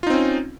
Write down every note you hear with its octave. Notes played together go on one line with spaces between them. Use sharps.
C4 C#4 D#4 F4